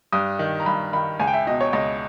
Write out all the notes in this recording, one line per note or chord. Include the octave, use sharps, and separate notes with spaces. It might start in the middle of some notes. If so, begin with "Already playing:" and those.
G2 D#6
D#3
A#5
G2 B5
D#3 B5
C#2 G#5
G5
E5
B2 D#5
C#5
C#2 D#5